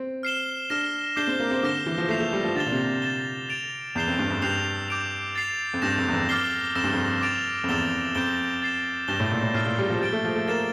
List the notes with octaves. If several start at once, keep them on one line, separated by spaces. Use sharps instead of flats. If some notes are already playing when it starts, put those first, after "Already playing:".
Already playing: C4
F6 C7 E7 G7
D4 F6 A#6 E7
D4 D6 G6 C7 E7 G7
C4
A#3
C4
D3 D6 F6 A#6 E7
E3
F3
A3 G6 C7 F7
A3
G3
F3
D3 A6 E7 G7
A#2
C3
A6 E7 G7
A6 D7 F7
E2 G6 C7 E7 G7
F2
G2
F2
G2 E6 G6 C7 F7
D6 G6 D7 F7
A6 C7 F7
F2
G2 E6 G6 A#6 E7
F2
E2
F2
D6 F6 A6 C7 G7
F2 E6 A#6 E7
G2
F2
D6 A6 D7 F7
F2
E2 E6 A6 E7 G7
F2 D6 G6 D7 G7
A6 C7 E7
G2 G6 A#6 E7 G7
A2
A#2
A2
A2 F6 A6 C7
A#2
G3
F3
G3 A6 D7 G7
A3
F3
A3
A#3 A6 E7 G7